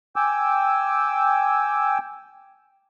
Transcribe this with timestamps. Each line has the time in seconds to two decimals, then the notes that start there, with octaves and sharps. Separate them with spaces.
0.16 G5 G#5 D6 E6